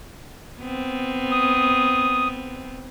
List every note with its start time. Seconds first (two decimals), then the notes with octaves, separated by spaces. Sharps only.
0.60 B3 C4
1.32 D#6